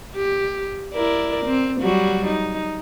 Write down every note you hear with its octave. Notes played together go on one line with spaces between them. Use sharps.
G4
E4 A#4 D5
C4
F#3 G3 F#4
D#4